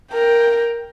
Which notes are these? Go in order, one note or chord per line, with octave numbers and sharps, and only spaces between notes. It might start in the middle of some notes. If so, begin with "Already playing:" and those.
A#4 G5